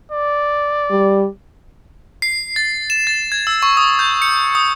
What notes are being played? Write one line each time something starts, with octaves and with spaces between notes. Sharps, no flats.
D5
G3
C7
A6
E7
A6
G#6
E6
C#6
D#6
G6
C#7
D#6